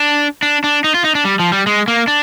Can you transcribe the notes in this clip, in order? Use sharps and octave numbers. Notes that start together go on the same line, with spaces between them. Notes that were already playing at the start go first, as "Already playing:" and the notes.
Already playing: D4
D4
D4
D#4
F4
D#4
D4
G3
F3
G3
G#3
A#3
D4